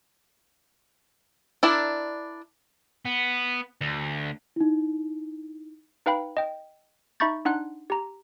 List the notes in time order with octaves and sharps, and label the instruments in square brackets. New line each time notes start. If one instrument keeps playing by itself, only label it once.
[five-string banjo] D4 E4 A#4 D5
[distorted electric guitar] B3
D2
[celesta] D#4 E4
[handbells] D#4 B4 F5 G5 B5
D#5 G5
D#4 E5 B5 C#6 G6 A6
D4 D#4 F#5 C6 F#6
G4 A#5